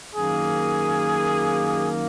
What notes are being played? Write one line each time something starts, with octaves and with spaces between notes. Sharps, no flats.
F#2 D#3 A#3 G#4